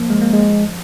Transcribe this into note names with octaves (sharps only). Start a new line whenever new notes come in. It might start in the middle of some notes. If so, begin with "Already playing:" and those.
Already playing: F3 A#3
G#3
A#3
G#3